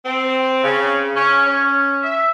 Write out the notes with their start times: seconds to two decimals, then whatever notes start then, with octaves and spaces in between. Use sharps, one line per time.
0.05 C4
0.63 C#3
1.16 C#4
1.46 C#4
2.03 E5